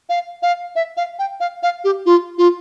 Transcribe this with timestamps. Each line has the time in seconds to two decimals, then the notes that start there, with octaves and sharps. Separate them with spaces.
0.09 F5
0.43 F5
0.75 E5
0.97 F5
1.19 G5
1.40 F5
1.63 F5
1.84 G4
2.06 F4
2.38 F4